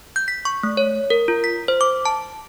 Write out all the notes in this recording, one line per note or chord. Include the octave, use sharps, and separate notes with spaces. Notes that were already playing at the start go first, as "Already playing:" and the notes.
G6
B6
C#6
A3
C#5
A#4
F4
B6
C5
D6
A5